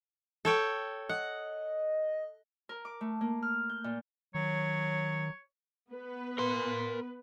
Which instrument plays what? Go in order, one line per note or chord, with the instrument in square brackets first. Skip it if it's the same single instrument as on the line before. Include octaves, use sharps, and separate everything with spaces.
[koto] A4 C#5 G5
[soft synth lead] D#5 [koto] F#5
[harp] A#4
D6
A3
A#3
F6
G6
A#2
[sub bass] D#3 [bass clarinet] F#3 [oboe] C#5
[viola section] B3 B4
[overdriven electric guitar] A#4 C6